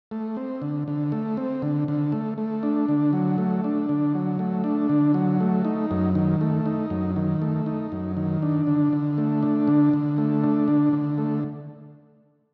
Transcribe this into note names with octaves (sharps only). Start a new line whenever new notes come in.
A3
C4
D3
D3
A3
C4
D3
D3
A3
A3
D4
D3
F#3
A3
D4
D3
F#3
A3
D4
D3
F#3
A3
D#4
F#2
D#3
A3
D#4
F#2
D#3
A3
D#4
F#2
D#3
D4
D3
D3
A3
D4
D3
D3
A3
D4
D3
D3
A3